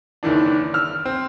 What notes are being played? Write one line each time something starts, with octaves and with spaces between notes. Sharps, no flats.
F#1 D#3 E3 D4
E6 F6
C4